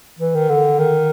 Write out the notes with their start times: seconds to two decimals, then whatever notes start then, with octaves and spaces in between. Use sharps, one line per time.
0.19 E3
0.34 D#3
0.49 D3
0.79 D#3